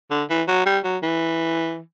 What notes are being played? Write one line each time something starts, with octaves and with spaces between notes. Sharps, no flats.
D3
E3
F#3
G3
F#3
E3